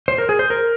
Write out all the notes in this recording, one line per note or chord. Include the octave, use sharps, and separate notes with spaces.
C5
A#4
G#4
C5
A#4